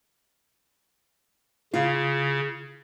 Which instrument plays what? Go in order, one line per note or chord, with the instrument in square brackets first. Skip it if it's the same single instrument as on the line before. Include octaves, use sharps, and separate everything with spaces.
[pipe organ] C#3 [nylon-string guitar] F4